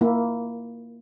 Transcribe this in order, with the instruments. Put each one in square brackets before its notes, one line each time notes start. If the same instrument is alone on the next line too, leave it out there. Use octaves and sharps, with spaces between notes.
[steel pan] A#3 E4